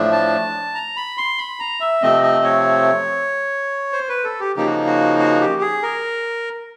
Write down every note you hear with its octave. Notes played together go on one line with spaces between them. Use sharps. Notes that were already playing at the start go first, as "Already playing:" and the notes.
Already playing: A2 F3 A3 D4
A5
A#5
B5
C6
B5
A#5
E5
C3 F3 A3 C4 D#5
D#5
C#5
C5
B4
A4
G4
C#3 F3 A#3 D#4 G4
F#4
F#4
F#4
G4
G#4
A#4